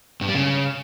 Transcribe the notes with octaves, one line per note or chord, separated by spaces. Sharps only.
G2
G3
C#3